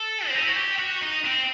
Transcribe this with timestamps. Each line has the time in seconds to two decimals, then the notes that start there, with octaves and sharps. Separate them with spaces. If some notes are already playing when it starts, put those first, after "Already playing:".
Already playing: A4
0.27 C4
0.35 D#4
0.41 E4
0.49 F#4
0.56 G4
0.79 F#4
1.02 D#4
1.25 C4